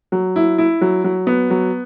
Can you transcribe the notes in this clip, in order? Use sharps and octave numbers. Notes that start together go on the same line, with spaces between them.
F#3
E4
E4
F#3
F#3
B3
F#3